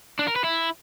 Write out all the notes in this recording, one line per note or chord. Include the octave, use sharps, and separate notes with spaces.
D4
A#4
B4
E4